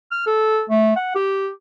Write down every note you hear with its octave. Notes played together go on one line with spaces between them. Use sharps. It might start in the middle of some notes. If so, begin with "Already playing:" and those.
F6
A4
A3
F#5
G4